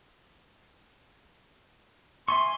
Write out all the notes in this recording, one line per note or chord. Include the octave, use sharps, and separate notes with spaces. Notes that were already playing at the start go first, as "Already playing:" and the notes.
E5 G#5 C6 C#6